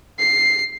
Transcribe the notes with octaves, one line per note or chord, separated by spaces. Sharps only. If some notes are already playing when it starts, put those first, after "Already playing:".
C7